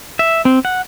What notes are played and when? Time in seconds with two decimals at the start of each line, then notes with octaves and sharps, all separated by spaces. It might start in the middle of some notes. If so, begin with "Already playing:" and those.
0.19 E5
0.45 C4
0.65 F#5